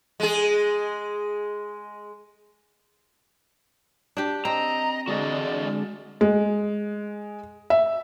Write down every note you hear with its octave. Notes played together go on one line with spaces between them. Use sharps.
G#3 G#4
D4 G4
C4 D#5 A#5
D3 G#3 F#4 G#4 D5 D#5
G#3
E5